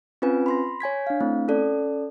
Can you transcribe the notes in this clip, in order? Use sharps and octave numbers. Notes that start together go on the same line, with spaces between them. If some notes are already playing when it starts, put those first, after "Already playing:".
C4 C#4 F4 B4 G#5
B5 C6 A#6
C#5 G#5 G#6 B6
D4 F5
A3 C4 E4
C#4 A4 D5